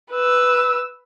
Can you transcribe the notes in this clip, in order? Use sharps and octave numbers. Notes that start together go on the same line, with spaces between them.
B4 E6